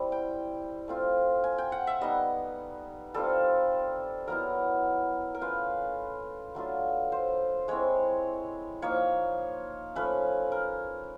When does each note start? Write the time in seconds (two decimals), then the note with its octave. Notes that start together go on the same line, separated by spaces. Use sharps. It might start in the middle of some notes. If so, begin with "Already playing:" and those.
Already playing: G3 C4 E4
0.12 G5
0.88 A3 C4 F4
1.44 G#5
1.58 G5
1.72 F#5
1.87 E5
2.01 G3 B3 D#4 D#5
3.14 G3 C4 F4 A4
4.28 F#3 B3 E4 A#4
5.35 A#4
5.41 A3 C#4 F4 B4
6.55 F#3 A3 D4 F4
7.12 C5
7.68 G#3 C4 E4 C#5
8.82 F3 A#3 D#4 C#5
9.95 F3 A3 C#4 B4
10.52 A#4